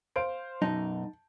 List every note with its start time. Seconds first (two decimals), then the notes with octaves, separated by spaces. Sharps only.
0.16 C5 F5 D7
0.62 B1 F#2 D#4 A5